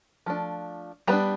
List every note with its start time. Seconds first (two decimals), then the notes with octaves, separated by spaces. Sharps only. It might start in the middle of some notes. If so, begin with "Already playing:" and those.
0.26 F3 A3 D4
1.07 G3 B3 D4 A#5